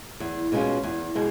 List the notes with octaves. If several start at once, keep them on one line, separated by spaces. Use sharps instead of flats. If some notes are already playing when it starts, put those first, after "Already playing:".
E2
B2 G#3 C#4 F4
E2
B2 G#3